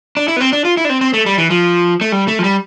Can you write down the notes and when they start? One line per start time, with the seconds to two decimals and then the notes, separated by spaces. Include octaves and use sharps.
0.17 D4
0.28 E4
0.36 B3
0.40 C4
0.53 D4
0.65 F4
0.77 E4
0.85 D4
0.90 C4
1.01 C4
1.14 A3
1.26 G3
1.38 E3
1.50 F3
2.01 A3
2.12 G3
2.28 A3
2.39 F3
2.44 G3